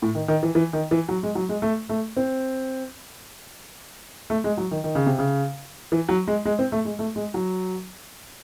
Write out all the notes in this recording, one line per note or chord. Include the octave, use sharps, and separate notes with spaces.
A2
D#3
D#3
E3
E3
D#3
E3
F#3
G#3
F#3
G#3
A3
A3
C4
A3
G#3
F#3
D#3
D#3
C#3
C3
C#3
E3
F#3
G#3
G#3
C4
A3
G#3
A3
G#3
F#3